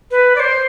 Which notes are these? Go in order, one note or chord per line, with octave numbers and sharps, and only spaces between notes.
B4
D5
C5